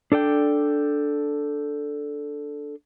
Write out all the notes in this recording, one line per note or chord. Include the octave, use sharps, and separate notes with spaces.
D4 A4 D5 G5